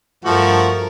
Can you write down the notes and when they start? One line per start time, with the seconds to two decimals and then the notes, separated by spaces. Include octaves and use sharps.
0.25 G2 F3 A3 F#4 A#4